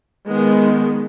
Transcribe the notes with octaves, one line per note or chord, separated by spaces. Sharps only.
D#3 G#3 B3